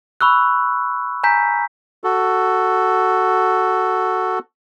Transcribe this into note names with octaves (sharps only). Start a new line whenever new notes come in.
B5 C#6 E6 F#6
G#5 A#5 G6 B6
F#4 A4